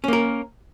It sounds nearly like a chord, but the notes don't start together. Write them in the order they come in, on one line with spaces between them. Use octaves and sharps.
C#4 A#3 A#4